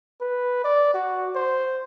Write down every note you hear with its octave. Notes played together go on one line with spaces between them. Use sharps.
B4
D5
F#4
C5